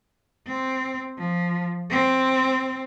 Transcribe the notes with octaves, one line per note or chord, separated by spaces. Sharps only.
C4
F3
C4